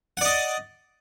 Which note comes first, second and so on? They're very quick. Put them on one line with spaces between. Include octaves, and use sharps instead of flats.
F#5 D5 D#5